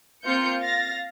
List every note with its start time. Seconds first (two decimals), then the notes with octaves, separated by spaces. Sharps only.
0.24 A#3 C4 F4 G6 C#7
0.61 F5 A6 A#6